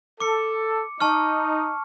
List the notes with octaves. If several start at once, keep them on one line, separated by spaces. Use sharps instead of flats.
A4 D6 C#7
D#4 A5 C#6 F6